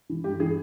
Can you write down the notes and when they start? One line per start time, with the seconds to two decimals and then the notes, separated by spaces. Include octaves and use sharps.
0.10 E3
0.24 G2 G4
0.40 E3 G#4